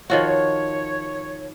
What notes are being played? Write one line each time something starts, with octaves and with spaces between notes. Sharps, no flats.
D#3 F3 F#4 C#5